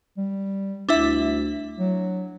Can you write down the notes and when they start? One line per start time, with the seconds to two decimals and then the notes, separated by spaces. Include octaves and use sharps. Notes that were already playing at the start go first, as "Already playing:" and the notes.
0.18 G3
0.89 D2 D4 E4 E5
1.79 F#3